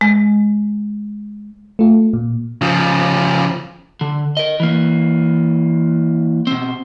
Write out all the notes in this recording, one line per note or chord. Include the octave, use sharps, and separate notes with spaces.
G#3
A3 F4
A#2
C#3 F3
D3
A#4 D#5
E3 A#3
B2 C4